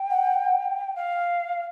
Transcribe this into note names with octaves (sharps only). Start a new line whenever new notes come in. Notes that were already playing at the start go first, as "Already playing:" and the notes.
Already playing: G5
F#5
F5